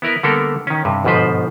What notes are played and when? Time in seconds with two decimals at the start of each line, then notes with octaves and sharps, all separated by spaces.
0.02 B3 E4 A#4 B4
0.23 D3 G3 A#3 B3 A4 A#4
0.67 D#3 C#4
0.85 G2 C3
1.04 G1 G#2 B2 F3 B4 C5